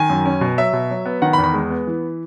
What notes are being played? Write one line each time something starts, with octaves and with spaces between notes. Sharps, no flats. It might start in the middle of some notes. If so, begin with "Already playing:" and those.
Already playing: D#3 G#5
F#2
C#4
B2
F#3 E5
B2
F#3
B3
D#3 F#5
B5
E2
B5
G#3
B3
E3